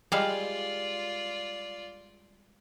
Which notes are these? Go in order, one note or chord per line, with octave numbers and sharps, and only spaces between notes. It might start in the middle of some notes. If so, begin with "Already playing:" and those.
G3 G#3 F4 D5 F5